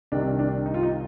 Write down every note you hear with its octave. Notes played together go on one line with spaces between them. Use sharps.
C2 C3 D#3 G3 D4
D4
D#4
F4
D#4